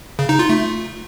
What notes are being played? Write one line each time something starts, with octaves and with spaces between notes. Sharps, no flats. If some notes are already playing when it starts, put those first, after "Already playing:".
C#3
D#4
F4
A3